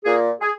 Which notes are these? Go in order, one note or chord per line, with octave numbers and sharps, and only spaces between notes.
A#2 G#4
G#4